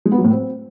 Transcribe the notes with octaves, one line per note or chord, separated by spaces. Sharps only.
G#3
B3
F#3
A2
C4